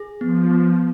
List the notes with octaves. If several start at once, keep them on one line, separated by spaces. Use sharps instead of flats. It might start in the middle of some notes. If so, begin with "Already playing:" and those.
Already playing: G#4
F3 B3
B3